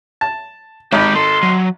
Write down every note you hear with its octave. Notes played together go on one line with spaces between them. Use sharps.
A5
G#1 G#3 D#4 G4 B5
A4 C6
F#3